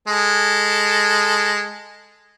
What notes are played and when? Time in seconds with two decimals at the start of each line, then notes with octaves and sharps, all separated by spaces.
0.08 G#3 A4